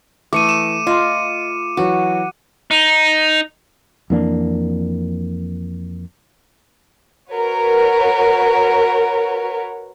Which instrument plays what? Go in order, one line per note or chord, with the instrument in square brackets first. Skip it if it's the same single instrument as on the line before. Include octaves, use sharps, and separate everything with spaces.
[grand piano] E3 [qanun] A3 [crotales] D6 C#7 D#7
[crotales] E7
[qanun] F4 [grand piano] D#5 C6
[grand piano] E3 F#3 [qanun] F#4
[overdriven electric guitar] D#4
[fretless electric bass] F2 E3 A#3 D4
[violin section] F#4 A#4 B4 C#5